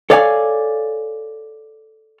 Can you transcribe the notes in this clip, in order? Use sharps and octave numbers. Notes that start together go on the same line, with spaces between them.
A4 C#5 D5 F5 F#5 G#5